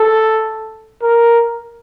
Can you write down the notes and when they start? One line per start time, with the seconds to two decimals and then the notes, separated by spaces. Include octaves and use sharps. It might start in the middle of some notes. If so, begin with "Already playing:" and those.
Already playing: A4
1.03 A#4